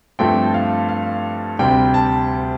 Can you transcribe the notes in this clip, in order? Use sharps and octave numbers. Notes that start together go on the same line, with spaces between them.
G2 F3 A3 C4 G5
F5
F5
D2 C3 G3 G5
A5